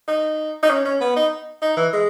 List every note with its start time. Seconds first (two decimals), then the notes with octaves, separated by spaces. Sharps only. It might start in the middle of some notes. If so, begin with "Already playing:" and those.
0.08 D#4
0.63 D#4
0.70 C#4
0.85 C#4
1.01 B3
1.16 D#4
1.62 D#4
1.77 E3
1.93 G#3